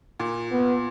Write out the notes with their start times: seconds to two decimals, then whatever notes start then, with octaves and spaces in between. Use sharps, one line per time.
0.20 A#2
0.51 B3